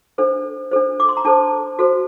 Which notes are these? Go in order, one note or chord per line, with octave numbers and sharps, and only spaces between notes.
D4 A4 C5
D4 A4 C5
D6
C6
A#5
D4 A4 C5 A5
F#4 A4 C5